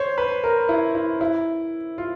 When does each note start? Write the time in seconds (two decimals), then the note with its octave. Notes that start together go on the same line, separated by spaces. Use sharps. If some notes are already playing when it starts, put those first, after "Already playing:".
Already playing: C5 C#5
0.18 B4
0.44 A#4
0.69 E4
0.95 E4
1.21 E4
1.98 F4